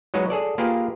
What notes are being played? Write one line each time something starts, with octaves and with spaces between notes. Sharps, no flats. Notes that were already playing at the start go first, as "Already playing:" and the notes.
F#3 G#3 D#4 F#4 B4
G#4 A4 D5
A#3 F4 G4 G#4 A#4 B4